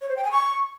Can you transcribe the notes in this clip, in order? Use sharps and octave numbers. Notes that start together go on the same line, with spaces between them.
C#5
C5
G5
G#5
C#6